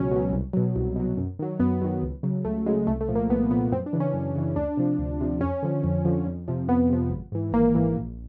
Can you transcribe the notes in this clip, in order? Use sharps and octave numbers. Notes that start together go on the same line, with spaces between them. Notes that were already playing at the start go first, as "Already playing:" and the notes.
Already playing: C#2 B2 F#3 C#4
B2 F#3
C2
B2 F#3
C2
B2 F#3
F#2
D#3 F#3
F#2 B3
D#3 F#3
C#2
C#3 F#3
C#2 A3
C#3 F#3 G#3
C2 A3
A3
A#2 F3
A#3
C2 B3
A#2 F3 B3
F#2 C4
D4
C#3 E3
C#4
F#2
C#3 E3
D2 D4
C3 F3
D2
C3 F3
F2 C#4
D3 F3
F2
D3 F3
F2
C3 F3
F2 B3
C3 F3
G#1
G#2 E3
G#1 A#3
G#2 E3
A#1